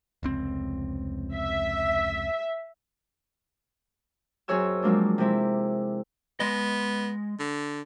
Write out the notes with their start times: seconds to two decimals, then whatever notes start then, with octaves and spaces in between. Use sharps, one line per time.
0.23 F1 C#2 C4
1.34 E5
4.48 F#2 C4 G#4 C#5 G#5 E6
4.83 F3 F#3 G#3 A#3 C4 D4
5.18 C3 G#3 C4 E4
6.40 G#3 B3 D#5
7.39 D3